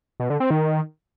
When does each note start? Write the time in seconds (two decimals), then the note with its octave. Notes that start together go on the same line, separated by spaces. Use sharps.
0.20 B2
0.30 D3
0.40 C4
0.51 D#3